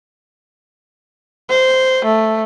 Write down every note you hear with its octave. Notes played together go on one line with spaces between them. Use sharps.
C5
A3